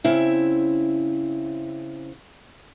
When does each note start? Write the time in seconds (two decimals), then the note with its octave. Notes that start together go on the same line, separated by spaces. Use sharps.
0.04 C#3 C4 E4 E5